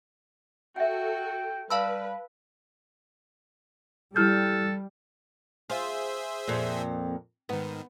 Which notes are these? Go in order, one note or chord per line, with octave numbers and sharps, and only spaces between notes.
F#4 A4 E5 F#5 G5
G3 B4 F5 A5 B5 E6
G3 E4 A4 F6 G6
F4 G#4 C5 E5
F2 A#2
G#2 D#3 B3